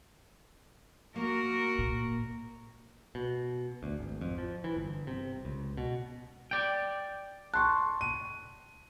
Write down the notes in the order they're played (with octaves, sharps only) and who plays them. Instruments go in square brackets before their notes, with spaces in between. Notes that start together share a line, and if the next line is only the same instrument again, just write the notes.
[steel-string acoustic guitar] A#3 [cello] F#4 A#4
[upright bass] A#2
[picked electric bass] B2
D2
G#1
F2
F3
E3
G1
C3
C#2
B2
[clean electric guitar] D5 G5
[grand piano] A5 C6 C#6 [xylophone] F#6
[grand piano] D#7